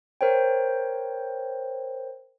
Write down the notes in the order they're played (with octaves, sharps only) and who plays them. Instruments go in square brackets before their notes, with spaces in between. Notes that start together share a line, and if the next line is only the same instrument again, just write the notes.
[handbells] A#4 C5 C#5 G5